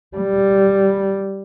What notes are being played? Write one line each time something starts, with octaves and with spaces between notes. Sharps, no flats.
G3